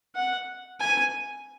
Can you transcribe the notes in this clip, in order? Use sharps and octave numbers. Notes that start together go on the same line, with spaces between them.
F#5
G#5